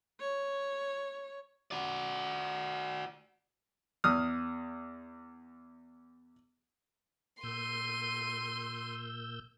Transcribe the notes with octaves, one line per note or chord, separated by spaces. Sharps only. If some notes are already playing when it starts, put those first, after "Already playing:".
C#5
F#4 D5
E2 D#6 F6
A#2 C6 E6 G6 D#7